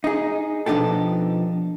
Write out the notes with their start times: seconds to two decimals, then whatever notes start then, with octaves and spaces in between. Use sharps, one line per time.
0.04 D#4 G#4
0.66 B2 F3 D4 D#4 G4 A4